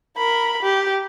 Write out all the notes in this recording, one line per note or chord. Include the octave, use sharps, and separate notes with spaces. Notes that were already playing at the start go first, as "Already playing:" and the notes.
A#4 B5
G4